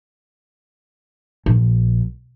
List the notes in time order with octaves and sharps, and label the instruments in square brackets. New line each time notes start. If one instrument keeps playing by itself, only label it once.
[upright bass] A#1